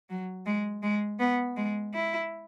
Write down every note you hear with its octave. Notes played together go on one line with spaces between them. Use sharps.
F#3
G#3
G#3
B3
G#3
E4